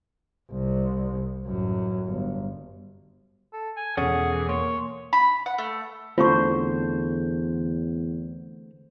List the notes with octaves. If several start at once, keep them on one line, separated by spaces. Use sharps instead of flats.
C2
A1 F#2
G1
A4
G#5
E2 B2 C#4 G#4 A4 C#5 F#5
E3
A#3 C#5 C6
B5
F#5
A3
E2 D3 A3 C4 F4 C5 C#6